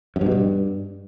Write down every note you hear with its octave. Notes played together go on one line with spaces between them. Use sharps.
F#2
G2
B2
G2